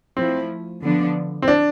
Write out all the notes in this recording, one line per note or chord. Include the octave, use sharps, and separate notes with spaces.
F3 A3 C4 E4
D3 F3 B3 D4
C4
D4